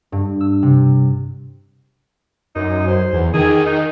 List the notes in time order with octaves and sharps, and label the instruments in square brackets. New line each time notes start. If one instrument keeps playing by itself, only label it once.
[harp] G2
E6
C3
[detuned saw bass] F#2 [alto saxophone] D#4
[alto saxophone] C5
[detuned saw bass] E2
[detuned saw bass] D#3 [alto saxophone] G#4
[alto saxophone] D#4